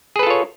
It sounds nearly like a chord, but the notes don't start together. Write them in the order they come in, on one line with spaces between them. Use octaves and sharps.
G#4 B4 A4 F4 C#5